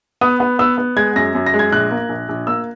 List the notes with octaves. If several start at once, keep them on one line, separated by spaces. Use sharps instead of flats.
B3 D#6
B3
B3 E6
B3
G#3 G#6
F#2 A#6
F#2
A#6
G#3
G#6
A#1 F#6
A#3
A#1
A#1
A#3 E6